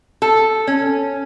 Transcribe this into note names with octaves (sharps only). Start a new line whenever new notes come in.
A4
C#4